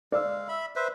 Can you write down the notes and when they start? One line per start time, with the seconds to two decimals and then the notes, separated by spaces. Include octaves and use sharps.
0.12 G#3 D5 F5 E6
0.48 E5 B5
0.76 B4 C5 E5